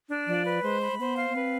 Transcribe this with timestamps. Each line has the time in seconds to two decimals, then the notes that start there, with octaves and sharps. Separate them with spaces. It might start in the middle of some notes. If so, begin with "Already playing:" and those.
0.09 D4
0.27 F3 D5
0.45 B4
0.63 G#3 C5
0.81 B5
0.92 G#3
0.99 B3 C5
1.17 F5
1.30 B3
1.35 C4 B4